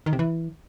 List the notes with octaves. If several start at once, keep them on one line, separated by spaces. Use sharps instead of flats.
D#3
C3
E3